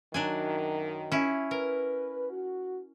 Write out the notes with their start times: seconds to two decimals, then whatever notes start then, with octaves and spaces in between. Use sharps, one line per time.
0.14 F#2 D#3 F#3 D4 G#5
1.12 C#4 E4
1.51 A#4 B4
2.30 F#4